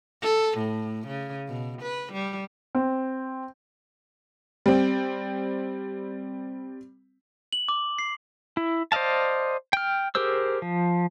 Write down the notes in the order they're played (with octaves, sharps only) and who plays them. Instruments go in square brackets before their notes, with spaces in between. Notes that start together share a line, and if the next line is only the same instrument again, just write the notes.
[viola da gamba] A4
A2
C#3
B2
B4
G3
[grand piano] C4
[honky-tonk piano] G3 C4
[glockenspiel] F#7
D6
C7
[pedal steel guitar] E4
C5 D5 D#5 F5 A5
G5 F6
G4 G#4 A#4 C5 E6
F3